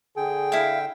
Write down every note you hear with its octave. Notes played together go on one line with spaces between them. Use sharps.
D3 G#4 G5
E4 F5